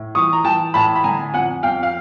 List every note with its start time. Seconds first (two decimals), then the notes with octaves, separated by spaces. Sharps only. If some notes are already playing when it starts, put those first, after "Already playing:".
Already playing: A2
0.15 E3 C#6 D#6
0.33 A#5
0.44 E3 G5 A5
0.74 A2 A5 B5
0.96 B5
1.04 D3 G#5 A#5
1.34 F2 F#5 G#5
1.63 F2 F5 G5
1.83 F5